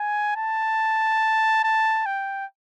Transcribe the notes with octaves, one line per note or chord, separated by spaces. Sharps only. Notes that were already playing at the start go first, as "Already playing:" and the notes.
Already playing: G#5
A5
A5
G5